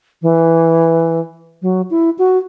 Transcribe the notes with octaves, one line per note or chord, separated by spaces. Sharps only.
E3
F#3
E4
F#4